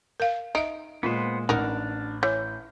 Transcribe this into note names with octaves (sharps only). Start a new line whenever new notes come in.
A#4 F5
D#4 D#5 E5 D7
A#2 G#3 B3 F4 B4 C5
A1 D4 D#4 A#4 F#5 F6
E3 C#5 G6